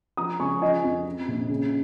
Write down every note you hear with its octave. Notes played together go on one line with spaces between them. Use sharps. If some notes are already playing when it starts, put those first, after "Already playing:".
F3 A#5 D#6
C#2 G#5 C#6
F3 D#5 G#5
F2
F3
A#1
C#3